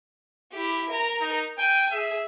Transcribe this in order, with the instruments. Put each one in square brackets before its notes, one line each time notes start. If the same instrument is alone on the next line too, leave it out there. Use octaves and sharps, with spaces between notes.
[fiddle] E4 G4
A#4 A#5
[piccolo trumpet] D#4
[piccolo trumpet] G5 [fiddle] G#5
[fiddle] G#4 [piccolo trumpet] E5